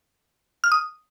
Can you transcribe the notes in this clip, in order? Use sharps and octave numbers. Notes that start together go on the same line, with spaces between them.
F6
D#6